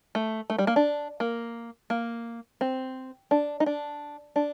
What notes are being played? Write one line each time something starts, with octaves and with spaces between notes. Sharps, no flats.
A3
A3
G3
A#3
D4
A#3
A#3
C4
D4
D#4
D4
D4